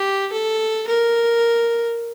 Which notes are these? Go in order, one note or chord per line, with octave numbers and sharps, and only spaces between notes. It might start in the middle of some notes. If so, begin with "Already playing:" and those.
Already playing: G4
A4
A#4